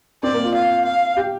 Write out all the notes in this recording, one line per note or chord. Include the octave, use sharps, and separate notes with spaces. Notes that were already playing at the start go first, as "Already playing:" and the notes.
C4 D5
A#3
F4
F5
F5
G4